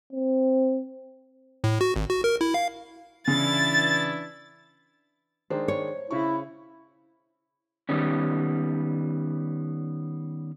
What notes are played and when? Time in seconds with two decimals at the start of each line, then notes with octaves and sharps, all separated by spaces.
0.12 C4
1.64 A2
1.81 F#4
1.96 G#1
2.10 F#4
2.24 A#4
2.41 E4
2.54 F5
3.28 C#3 E3 D4 E4 A6
5.50 D#3 G#3 D4 C5
5.68 C#5
6.11 C#3 E4 C#6
7.89 D#3 G3 B3 C#4